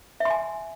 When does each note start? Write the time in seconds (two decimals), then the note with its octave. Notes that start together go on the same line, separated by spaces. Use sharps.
0.20 E5
0.25 C6
0.30 G#5